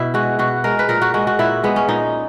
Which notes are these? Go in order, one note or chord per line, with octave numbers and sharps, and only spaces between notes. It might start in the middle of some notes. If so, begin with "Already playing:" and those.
Already playing: B2 B3 E4
G#3 F#4
B2 F#4
G#3 A#4
B4
A#2 A#4
F#4
G#3 F#4
F#4
A#2 E4
G#3 B3
C#4
A#2 D#4